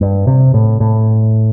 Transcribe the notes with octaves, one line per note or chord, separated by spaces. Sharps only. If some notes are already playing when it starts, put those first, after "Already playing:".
G2
C3
A2
A2